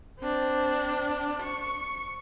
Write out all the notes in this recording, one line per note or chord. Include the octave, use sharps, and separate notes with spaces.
C4 D4
C#6